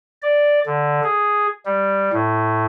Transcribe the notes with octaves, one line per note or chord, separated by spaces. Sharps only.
D5
D3
G#4
G3
A2